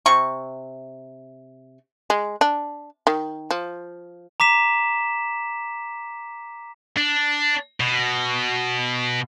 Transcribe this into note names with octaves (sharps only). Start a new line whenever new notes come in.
C3 C#6
G#3
D4
D#3
F3
A#5 D6 B6 E7
D4
B2